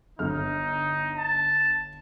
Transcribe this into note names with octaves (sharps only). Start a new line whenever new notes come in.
G1 D#4 F6
A5